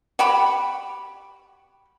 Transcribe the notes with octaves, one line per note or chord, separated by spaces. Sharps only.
F#4 G4 B5